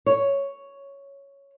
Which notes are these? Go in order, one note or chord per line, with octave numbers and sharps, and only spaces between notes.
C#5